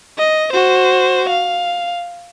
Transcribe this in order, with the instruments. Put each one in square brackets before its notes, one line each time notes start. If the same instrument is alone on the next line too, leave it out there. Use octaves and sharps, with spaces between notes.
[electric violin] D#5
F#4 C5
F5